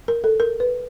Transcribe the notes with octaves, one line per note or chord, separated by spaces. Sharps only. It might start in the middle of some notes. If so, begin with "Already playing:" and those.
A#4
A4
A#4
B4